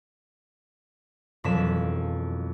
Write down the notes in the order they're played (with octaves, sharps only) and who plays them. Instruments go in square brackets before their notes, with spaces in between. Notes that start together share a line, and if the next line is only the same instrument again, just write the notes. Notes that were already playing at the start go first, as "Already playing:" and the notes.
[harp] E1 F2 F#3 B6 E7